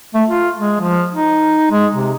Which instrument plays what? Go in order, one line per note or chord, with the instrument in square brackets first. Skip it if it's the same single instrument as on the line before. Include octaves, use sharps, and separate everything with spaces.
[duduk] A3
F4
G#3
F3
D#4
G#3
C3